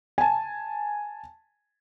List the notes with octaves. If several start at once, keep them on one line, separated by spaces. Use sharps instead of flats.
G#5 A5